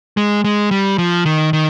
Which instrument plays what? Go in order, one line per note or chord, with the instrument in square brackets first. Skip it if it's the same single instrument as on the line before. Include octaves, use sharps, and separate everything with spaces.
[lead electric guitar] G#3
G#3
G3
F3
D#3
D#3